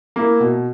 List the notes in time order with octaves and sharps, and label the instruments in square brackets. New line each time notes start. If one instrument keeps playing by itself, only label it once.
[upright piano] A#3 E4
B2